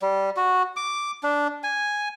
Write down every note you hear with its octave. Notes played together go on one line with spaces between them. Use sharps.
G3
F#4
D6
D4
G#5